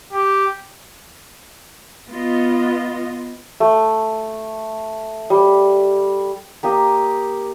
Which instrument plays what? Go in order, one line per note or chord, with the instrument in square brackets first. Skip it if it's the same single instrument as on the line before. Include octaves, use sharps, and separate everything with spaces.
[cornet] G4
[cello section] B3 F4 D#5
[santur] A3
G3
A#3 G4 D#5